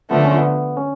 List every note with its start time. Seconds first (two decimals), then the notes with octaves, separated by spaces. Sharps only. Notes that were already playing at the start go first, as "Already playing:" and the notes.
0.11 D3 F3 A3 B3
0.25 C#4
0.38 B3
0.77 C#4